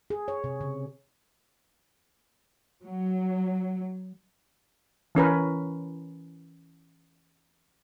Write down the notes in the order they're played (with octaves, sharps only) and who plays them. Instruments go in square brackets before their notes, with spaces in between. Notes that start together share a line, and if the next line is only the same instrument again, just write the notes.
[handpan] G#4
C#5
C3
C#3
[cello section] F#3
[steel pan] E3 C#4 A#4 B4